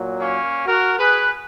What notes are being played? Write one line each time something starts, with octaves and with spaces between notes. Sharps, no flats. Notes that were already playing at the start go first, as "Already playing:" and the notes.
Already playing: A#2 F#3
A#3 C#4
F#4 A#4
G#4 B4